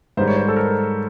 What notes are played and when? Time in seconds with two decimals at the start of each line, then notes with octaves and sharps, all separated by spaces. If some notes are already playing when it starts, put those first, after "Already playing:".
0.17 G#2 D#3 G3 C5
0.28 C#5
0.37 C5
0.48 A4
0.56 A#4